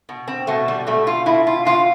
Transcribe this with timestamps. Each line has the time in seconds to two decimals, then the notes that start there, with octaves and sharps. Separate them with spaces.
0.09 B2
0.28 C4
0.47 B2 A3
0.68 G3
0.87 B2 A3
1.07 F4
1.26 B2 E4
1.47 F4
1.65 B2 F4